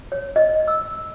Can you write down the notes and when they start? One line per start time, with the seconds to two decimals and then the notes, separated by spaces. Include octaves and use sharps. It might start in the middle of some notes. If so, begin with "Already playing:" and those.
0.12 C#5
0.36 D#5
0.68 E6